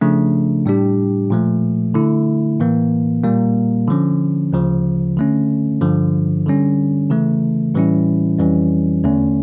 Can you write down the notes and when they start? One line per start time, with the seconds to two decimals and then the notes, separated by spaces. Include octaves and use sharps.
0.01 C#3 F3 A3 D4
0.66 A2 G3 D4 G4
1.30 A#2 F3 A3
1.94 D3 A3 E4
2.60 A2 E3 A#3
3.24 A#2 G3 A#3
3.88 D3 F3 C#4
4.53 D2 C#3 F3
5.17 D3 A3 C#4
5.81 G2 D3 F3
6.46 D3 G3 C#4
7.10 C#3 E3 A3
7.74 A2 E3 G3 C#4 E4
8.39 F2 E3 G3 C#4
9.04 E2 D3 A3 C#4